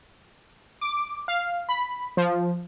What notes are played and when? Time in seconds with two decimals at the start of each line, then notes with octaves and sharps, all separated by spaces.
0.81 D6
1.28 F5
1.69 B5
2.17 F3